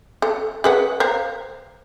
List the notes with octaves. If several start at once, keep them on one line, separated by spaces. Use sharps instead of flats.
A4
G#4 B4 F#5
C5 F5 A#5